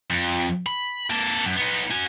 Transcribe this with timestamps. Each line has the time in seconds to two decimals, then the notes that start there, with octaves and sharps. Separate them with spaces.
0.10 F2
0.66 B5
1.10 A#3 A4
1.45 F#2
1.56 B3 D#4
1.91 F#4 G#5